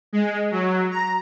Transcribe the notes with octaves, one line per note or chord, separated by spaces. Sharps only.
G#3
F#3
A#5